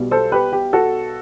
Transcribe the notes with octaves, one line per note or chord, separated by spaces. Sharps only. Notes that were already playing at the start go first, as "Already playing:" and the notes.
Already playing: B1 B2 G3
A4 C5
G4 B4
G4
F#4 A4